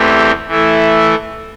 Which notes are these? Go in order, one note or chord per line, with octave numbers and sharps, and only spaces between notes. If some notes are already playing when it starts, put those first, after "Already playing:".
Already playing: E2 E3 A3 C4 G4
E3 A3 E4